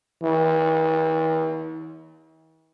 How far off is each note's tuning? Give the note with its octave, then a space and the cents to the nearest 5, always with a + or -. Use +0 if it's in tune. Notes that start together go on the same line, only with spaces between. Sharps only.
E3 -45